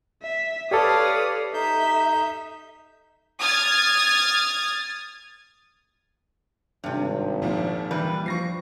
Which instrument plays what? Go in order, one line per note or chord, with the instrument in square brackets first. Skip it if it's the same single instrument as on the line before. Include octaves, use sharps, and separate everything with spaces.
[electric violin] E5
[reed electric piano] G4 A4 [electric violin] B4 D#6 [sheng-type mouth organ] C#5 D5 F5
[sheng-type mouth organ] D#4 G6 [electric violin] E5
[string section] D#6 F6 G#6 A6
[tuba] G#1 [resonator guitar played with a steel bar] G2 C3
[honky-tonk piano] D#2 A#2 F3
[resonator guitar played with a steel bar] E3 G3 B4
[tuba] F3 [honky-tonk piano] C#6 A#6 C7